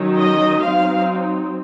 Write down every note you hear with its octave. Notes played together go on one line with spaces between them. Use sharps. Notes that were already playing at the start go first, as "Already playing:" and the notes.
Already playing: D#3 F#3 C#4
D#5
F#3 C4 D#4 F5